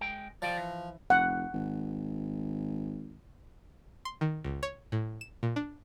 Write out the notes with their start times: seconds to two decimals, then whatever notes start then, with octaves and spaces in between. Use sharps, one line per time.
0.01 G#3 G5
0.42 F3 D5 G5
0.57 E3
1.10 F1 F#5
1.53 G#1
4.05 C6
4.21 D#3
4.44 C#2
4.63 C#5
4.92 A2
5.21 E7
5.43 A#2
5.56 D4